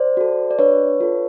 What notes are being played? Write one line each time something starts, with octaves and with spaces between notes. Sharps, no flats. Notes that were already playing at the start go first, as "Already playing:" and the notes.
Already playing: C5 D5
F#4 A4
D5
D4 B4 C#5
F4 A4